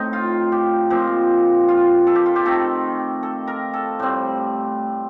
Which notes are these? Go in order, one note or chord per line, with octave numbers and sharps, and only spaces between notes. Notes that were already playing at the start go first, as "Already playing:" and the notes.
Already playing: A2 A3 C4 D#4
F4
G4
A#2 F3 C4 G4
F4
A4
G4
F4
G4
D#3 A3 C4 A4
A4
A#4
A4
A2 G3 C4